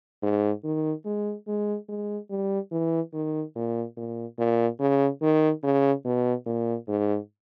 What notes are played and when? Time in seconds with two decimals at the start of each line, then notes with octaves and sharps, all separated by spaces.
0.23 G#2
0.64 D#3
1.05 G#3
1.47 G#3
1.89 G#3
2.30 G3
2.71 E3
3.13 D#3
3.56 A#2
3.97 A#2
4.39 A#2
4.79 C#3
5.22 D#3
5.63 C#3
6.05 B2
6.46 A#2
6.88 G#2